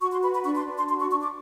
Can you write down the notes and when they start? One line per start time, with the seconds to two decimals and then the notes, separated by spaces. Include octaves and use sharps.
0.01 F#4 C#6
0.12 C6
0.23 B4 B5
0.34 B5
0.45 D4 C#6
0.56 C6
0.67 D4
0.78 C6
0.88 F#4 C6
1.00 C#6
1.10 D4 C#6
1.22 D6